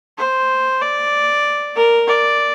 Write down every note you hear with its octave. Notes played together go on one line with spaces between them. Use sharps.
C5
D5
A#4
D5